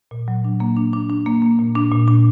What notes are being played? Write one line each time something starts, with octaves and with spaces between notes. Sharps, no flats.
A#2
F#3
D4
A#3
D4
D4
D4
A#3
A#3
A#2
D4
A#2
D4